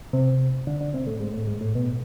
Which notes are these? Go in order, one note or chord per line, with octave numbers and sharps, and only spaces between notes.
C3
D3
D3
C3
A2
G#2
A2
G#2
A2
B2